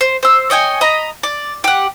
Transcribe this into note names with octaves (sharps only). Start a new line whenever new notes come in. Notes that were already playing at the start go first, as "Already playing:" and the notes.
C5
C5 E6
C#5 D#5 G5 G#5
D#5 A#5 B5
D5
G4 F#5